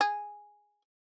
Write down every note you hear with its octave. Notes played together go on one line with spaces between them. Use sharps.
G#4